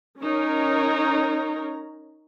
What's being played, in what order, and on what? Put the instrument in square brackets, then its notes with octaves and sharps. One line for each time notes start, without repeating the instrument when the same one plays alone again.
[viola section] C#4 D#4 A#4 C#5 A#5